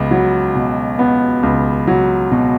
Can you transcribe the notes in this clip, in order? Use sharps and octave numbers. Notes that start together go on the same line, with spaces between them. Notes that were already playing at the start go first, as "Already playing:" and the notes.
Already playing: C#2 B3
F#3
B2
B3
C#2
F#3
B2